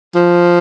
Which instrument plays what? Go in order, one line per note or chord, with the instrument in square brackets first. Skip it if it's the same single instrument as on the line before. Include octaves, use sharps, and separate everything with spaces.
[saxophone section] F3